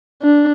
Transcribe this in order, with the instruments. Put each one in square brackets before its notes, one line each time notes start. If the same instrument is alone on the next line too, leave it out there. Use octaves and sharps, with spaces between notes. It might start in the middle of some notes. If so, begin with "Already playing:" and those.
[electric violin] D4